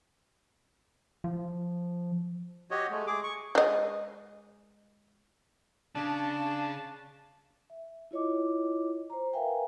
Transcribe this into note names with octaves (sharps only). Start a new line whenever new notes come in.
F3
F#4 G4 C#5 D#5
G#3 A3
G#4 D6
C#6
G#3 D#5
C#3 D4 A5
E5
E4 F4 C#5 D#5 D6
C5 A#5
A#4 B4 E5 F5 G5 G#5